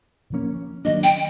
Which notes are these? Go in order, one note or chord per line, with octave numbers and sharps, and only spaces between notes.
A#2 F3 A#3 C#4
D#3 F#3 A#3 D4 D#5
G5